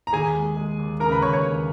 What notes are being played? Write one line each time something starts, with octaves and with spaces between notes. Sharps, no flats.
A#5
D#2 G#4 G#5
G#3
G#3
D#2
C#3 A#4 A#5
B4 B5
D#2 C#5 C#6
C#5 C#6
D#2